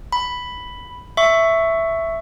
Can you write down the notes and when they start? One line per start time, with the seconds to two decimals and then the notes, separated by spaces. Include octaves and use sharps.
0.12 B5
1.17 E5 C#6